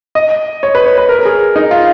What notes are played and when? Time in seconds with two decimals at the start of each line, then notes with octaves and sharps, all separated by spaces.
0.15 D#5
0.63 C#5
0.75 B4
0.86 C#5
0.98 B4
1.09 A#4
1.19 A#4
1.25 G#4
1.56 D#4
1.71 F4